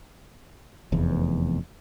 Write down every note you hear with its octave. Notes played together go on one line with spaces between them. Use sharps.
F1 E2